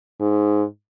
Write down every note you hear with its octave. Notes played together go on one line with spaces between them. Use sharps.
G#2